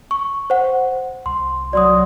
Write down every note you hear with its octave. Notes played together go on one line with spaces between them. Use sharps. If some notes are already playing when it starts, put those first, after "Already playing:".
C#6
C5 F#5
C2 C6
F#3 D5 C6 D#6